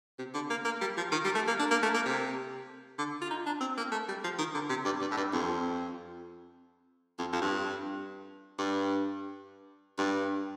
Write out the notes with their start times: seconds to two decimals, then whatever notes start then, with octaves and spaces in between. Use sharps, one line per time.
0.19 C3
0.34 D3
0.50 A#3
0.65 A#3
0.81 G3
0.97 F3
1.12 D#3
1.24 G3
1.35 A3
1.48 A#3
1.59 D4
1.71 A#3
1.83 A3
1.94 A#3
2.06 C3
2.98 D3
3.21 F4
3.31 D#4
3.46 D4
3.61 C4
3.77 A#3
3.92 A3
4.08 G3
4.24 F3
4.38 D#3
4.54 D3
4.69 C3
4.85 G2
5.01 G2
5.11 A2
5.17 G2
5.33 F2
7.18 F2
7.33 F2
7.42 G2
8.58 G2
9.99 G2